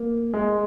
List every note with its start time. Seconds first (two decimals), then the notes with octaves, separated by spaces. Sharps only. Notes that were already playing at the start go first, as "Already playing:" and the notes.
Already playing: A#3
0.34 G#3